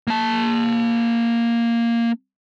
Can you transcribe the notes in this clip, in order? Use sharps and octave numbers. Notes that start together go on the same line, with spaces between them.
A#3 A5